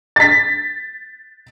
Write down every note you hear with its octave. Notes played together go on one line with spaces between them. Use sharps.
A6 B6